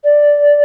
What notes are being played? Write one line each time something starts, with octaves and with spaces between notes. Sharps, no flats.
D5